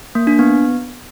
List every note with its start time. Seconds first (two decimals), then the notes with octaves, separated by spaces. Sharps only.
0.15 A#3
0.27 D4
0.39 B3